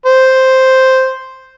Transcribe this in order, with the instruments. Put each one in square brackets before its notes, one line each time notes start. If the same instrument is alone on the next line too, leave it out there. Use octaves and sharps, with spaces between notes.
[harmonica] C5